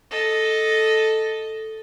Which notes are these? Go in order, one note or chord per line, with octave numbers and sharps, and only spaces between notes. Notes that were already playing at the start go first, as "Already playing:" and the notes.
A4 D#5